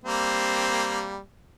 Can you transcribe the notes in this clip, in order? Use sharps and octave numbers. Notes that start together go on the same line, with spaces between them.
G3 A#3 C4